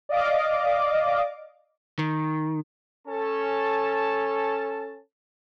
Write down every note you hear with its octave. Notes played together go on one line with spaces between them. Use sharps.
D5 D#5 F5 D6
D#3
C#4 A4 A5